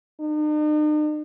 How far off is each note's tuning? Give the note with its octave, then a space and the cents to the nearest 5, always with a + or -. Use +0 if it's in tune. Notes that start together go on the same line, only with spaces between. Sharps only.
D#4 -45